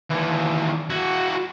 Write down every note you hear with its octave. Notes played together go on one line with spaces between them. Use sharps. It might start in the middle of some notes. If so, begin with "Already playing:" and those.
D#2 E3
E4 F#4